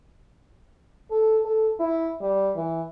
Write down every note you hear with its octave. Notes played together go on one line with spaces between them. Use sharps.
A4
A4
E4
G3
E3